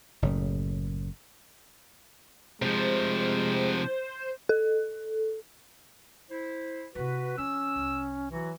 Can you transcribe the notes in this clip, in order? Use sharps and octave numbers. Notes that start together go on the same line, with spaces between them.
F#1 A2 C#3
C3 F3 G#3 C5
A4
E4 C5
C3 E4 F#4 B4
F2 C#4 E6
C2
E3 F#3 F#4